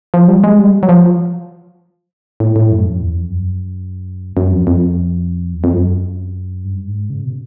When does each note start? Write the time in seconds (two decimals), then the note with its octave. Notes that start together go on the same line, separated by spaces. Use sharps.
0.14 F3
0.28 G3
0.44 G#3
0.59 G3
0.83 F#3
0.89 F3
2.40 A2
2.56 A2
2.71 F#2
2.86 F2
3.01 E2
3.16 F2
3.30 F#2
4.37 F#2
4.53 F2
4.67 F2
5.54 E2
5.64 F2
5.74 F#2
6.65 G2
6.87 G#2
7.10 C#3
7.25 B2